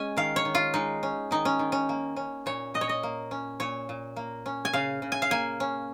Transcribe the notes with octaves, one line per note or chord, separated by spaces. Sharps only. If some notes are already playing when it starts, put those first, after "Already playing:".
Already playing: G#3 C#4 D#5 G#5
D#3 F5
C#5
D#3
F4
G#3 D#4
C#4
D#3 D#4
C#4
D#3
C#4
A#3
C#4
A#2 C#5
A#2 D#5
C#5
D#5
A#3
C#4
A#2 C#5
A#2
A#3
C#4
G#5
C#3 F5
C#3
G#5
F5
A#3 G#5
C#4